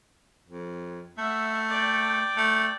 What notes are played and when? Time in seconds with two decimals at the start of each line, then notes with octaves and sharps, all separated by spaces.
0.48 F2
1.18 A3 E5 F#5
1.69 D5 G5
2.37 A3